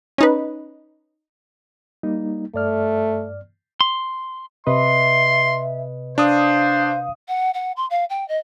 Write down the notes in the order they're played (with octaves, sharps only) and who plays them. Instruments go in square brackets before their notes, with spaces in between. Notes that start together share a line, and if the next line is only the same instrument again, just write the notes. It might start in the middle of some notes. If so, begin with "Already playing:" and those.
[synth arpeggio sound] C#4 D#4 B4
[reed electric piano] G3 A#3 D#4
[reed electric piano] G2 D5 F6 [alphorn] A3
[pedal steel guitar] C6
[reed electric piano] C3 B4 D#5 [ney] E5 [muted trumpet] C6
[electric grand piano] D4 D#6 [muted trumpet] C5 [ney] F5
[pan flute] F#5
F#5
C6
F5
G5
D#5